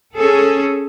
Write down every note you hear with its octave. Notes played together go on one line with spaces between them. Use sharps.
C#4 G#4 A4